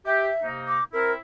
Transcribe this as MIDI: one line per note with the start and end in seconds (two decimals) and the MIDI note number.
0.06 0.29 67
0.06 0.46 76
0.43 0.79 48
0.43 0.79 58
0.43 0.79 63
0.68 0.84 86
0.93 1.17 60
0.93 1.17 64
0.93 1.12 70